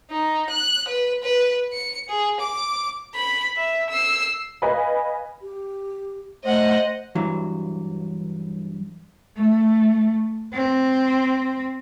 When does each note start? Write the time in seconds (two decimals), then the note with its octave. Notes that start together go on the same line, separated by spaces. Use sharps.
0.10 D#4
0.50 F#6
0.88 B4
1.23 B4
1.72 C#7
2.09 G#4
2.40 D6
3.15 B5
3.56 E5
3.90 E6 C7
4.62 B4 D#5 F5 G#5 B5
5.41 G4
6.44 A3 C5 D#5 F#5
7.15 G2 E3 F#3
9.37 A3
10.53 C4